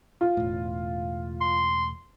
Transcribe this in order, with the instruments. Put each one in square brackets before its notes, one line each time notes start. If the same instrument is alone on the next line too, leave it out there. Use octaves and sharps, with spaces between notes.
[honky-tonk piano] F4
[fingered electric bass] E1 A2
[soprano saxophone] C6